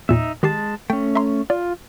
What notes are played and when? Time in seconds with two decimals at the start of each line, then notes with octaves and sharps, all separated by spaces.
0.09 E2 A#2 D#4 E5
0.43 D#3 G#3 G4 A5 C7
0.90 A3 C#4 G5
1.15 E5 A#5 C6
1.50 F4 D5